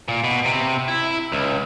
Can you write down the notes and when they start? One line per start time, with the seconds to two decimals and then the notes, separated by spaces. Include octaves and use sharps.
0.08 A#2
0.24 B2
0.45 C3
0.88 E4
1.32 C#2